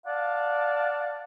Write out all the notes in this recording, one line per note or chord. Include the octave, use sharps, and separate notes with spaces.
D5 F5 F#5 A5